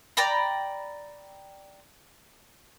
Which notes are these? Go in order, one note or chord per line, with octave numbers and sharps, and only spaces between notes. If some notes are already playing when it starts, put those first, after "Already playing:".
D5 G5 A#5 B5